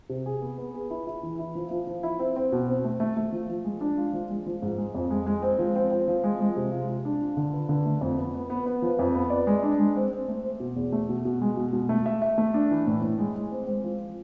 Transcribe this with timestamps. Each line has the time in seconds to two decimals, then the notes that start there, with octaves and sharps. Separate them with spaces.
0.09 C3
0.26 G#4
0.41 B3
0.58 B3
0.74 G#4
0.90 E4
1.07 E4
1.23 E3
1.39 E4
1.55 F3
1.71 F3
1.87 F3
2.03 E4
2.19 C4
2.36 C4
2.52 B2
2.68 C4
2.84 A3
3.00 A3
3.17 A3
3.32 F3
3.49 F3
3.64 G#3
3.81 D4
3.98 F4
4.14 F3
4.30 G#3
4.46 F3
4.62 G#2
4.78 G#3
4.95 F2
5.10 G#3
5.26 G#3
5.42 C4
5.59 F3
5.76 C4
5.91 C4
6.08 F3
6.24 G#3
6.40 G#3
6.57 C3
6.72 F4
6.88 F4
7.05 D4
7.20 F4
7.37 D3
7.53 B4
7.69 D3
7.85 A3
8.01 F2
8.18 B3
8.34 B3
8.50 B3
8.66 B3
8.82 F3
8.99 F2
9.15 B3
9.30 D5
9.47 G#3
9.63 D4
9.80 G#3
9.96 C4
10.11 C4
10.28 A3
10.43 C5
10.60 B2
10.76 E2
10.92 A3
11.09 B2
11.25 B2
11.41 G#3
11.57 B2
11.73 B2
11.89 A3
12.06 E5
12.22 E5
12.38 A3
12.54 D4
12.71 E3
12.87 A2
13.02 A2
13.19 G#3
13.35 G#3
13.51 C4
13.67 C4
13.84 F3